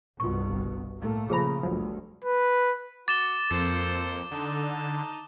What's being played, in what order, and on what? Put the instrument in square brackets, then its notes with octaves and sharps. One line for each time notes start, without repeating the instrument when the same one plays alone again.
[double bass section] C2 G2 B2 [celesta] F4 C#6
[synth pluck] G1
[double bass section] A2 A3 A#3
[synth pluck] A#2 F3 A#5 [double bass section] C#3 [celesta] G#4 B5
[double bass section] G1 D2 G2 [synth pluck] F3 F#3
[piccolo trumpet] B4
[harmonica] F#4 [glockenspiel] D6 [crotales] A6 E7 G7
[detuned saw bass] F2 [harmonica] A#3 A4 C5 [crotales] A6
[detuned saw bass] D3 [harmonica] D#4 A5